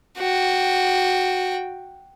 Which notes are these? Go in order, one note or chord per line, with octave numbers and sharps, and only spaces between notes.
F#4 G5